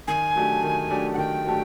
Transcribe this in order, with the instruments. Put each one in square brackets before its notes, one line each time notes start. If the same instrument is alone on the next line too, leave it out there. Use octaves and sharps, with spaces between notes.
[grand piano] D#3 [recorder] G#5
[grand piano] F#3 A3 D4 G4
D#3
F#3 A3 D4 G4
[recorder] F#5
[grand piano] D#3 [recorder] G5
[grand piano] F#3 A3 D4 G4